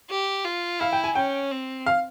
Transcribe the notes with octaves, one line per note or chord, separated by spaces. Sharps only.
G4
F4
E4 F5
G5
G#5
C#4 G5
C4
F5